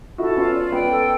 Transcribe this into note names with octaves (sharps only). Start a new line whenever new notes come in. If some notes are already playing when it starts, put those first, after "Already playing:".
E4 F#4 A4
B3 C#4 F4
D5
B3 C#4 G5
A4